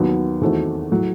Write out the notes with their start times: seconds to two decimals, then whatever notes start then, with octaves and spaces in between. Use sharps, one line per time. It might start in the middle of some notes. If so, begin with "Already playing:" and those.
Already playing: D#2 D#3 F#3 B3 F#4
0.41 E2 D#3 A3 C4 F#4
0.91 A2 F#3